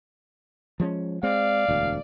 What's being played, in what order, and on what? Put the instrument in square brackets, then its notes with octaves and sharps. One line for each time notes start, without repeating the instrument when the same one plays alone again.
[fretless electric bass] F3 G#3 C#4
[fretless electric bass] G#3 C4 [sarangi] D5 [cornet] F5
[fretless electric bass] E1 D2